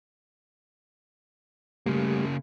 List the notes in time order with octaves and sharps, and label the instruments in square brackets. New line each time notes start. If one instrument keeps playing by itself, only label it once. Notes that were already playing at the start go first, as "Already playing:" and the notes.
[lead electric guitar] C#3 A#3 [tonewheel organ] G3 A3 G4